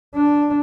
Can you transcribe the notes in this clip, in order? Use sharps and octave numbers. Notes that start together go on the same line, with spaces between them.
D4